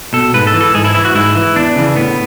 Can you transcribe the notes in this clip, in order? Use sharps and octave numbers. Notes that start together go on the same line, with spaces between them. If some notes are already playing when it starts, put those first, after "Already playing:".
B2 A4
G#2 B4
A4
E3
A4
G#2 G#4
E4
E3 E4
F#4
G#2 E4
E3
E2 D4
C#3 E3
A2 B3